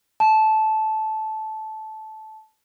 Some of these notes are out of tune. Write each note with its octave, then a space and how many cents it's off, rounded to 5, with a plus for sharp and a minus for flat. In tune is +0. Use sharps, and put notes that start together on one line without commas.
A5 -15